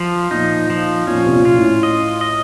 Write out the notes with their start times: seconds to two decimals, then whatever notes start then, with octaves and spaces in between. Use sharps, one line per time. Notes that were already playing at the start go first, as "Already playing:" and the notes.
Already playing: F3
0.31 A#2 D#4
0.70 F3
1.07 A#2 C#4
1.26 C3
1.33 A#2
1.45 F4
1.58 A2
1.83 D#5
2.21 D#5